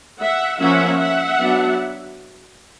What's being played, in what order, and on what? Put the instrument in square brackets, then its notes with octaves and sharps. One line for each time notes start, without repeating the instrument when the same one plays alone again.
[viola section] E5 F#5
F3 A#3 C#4 E5 F#5
E5 F#5
F#3 B3 D4